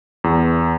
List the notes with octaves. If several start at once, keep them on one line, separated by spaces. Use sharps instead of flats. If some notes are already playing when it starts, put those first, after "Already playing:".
E2